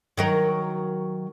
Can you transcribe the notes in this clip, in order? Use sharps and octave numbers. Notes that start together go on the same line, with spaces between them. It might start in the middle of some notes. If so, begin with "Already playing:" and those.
D#3 F#3 A#4